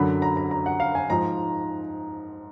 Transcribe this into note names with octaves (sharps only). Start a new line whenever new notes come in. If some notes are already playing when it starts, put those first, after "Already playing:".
Already playing: F#2 D3 F#3 B5
A#5
A#5
A#5
F#5
F5
G#5
G#2 F3 A#5